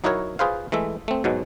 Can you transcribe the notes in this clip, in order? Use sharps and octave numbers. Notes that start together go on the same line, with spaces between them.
F#3 D#4 E4 F#4 A#4 C#5
F4 G#4 B4 C5 F5
E3 G#3 A3 E5
A3 C4
G#2 B2 F#3 G#3